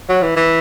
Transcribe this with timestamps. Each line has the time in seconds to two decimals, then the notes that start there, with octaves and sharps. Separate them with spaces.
0.09 F#3
0.22 E3
0.36 E3